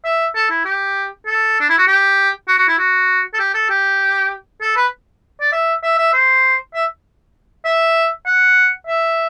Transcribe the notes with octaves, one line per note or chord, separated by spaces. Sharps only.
E5
A4
E4
G4
A4
D4
E4
F#4
G4
F#4
F#4
E4
F#4
A4
G4
A4
G4
A4
B4
D5
E5
E5
E5
C5
E5
E5
F#5
E5